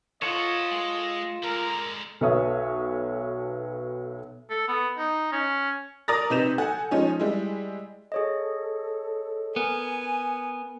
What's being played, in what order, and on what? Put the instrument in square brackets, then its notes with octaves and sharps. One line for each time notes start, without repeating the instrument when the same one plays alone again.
[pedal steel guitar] F4 A4 C#5 [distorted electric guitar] A#4 F#5 [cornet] D#5
[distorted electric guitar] G#3
[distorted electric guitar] D3 G#3 [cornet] A#4
[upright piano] B1 B3 A4 C#5 E5 D#6
[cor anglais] A4
B3
D#4
C#4
[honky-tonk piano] A#4 D5 A#5 D#6 A6 A#6
C3 D#4 B4 G6 E7 F7
A4 F#5 G#5
F3 G#3 C#4 D#4
G3 G#3 E4
[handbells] G#4 C#5 D#5 [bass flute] A4
[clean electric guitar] B3 [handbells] A#4 [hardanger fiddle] G#5